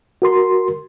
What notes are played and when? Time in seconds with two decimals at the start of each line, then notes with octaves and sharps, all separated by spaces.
0.22 F#4 A#4 C6